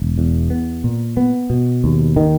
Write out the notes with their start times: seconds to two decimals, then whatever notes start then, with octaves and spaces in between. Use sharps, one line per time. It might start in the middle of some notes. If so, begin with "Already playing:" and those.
Already playing: E1
0.18 E2
0.50 B3
0.84 A#2
1.17 B3
1.50 B2
1.84 D#2
2.16 D#3